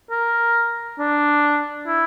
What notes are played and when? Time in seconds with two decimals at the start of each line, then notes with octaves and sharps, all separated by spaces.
0.11 A#4
0.98 D4
1.87 E4